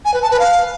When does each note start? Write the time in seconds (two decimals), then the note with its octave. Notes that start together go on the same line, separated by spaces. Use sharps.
0.05 G#5
0.14 B4
0.22 A5
0.31 B4
0.39 F5